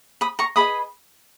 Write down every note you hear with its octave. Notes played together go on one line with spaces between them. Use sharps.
B5 D#6
A#5 C#6
G#4 B4 D#5 B5 D#6